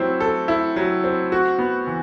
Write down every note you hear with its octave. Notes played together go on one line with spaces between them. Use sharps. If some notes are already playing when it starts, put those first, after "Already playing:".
Already playing: F#3 C4 E4
A4
E4
F#3
C4
F#4
B3
E3